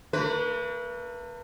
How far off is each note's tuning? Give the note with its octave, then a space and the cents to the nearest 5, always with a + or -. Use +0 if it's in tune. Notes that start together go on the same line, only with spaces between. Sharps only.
A3 +45 B4 -25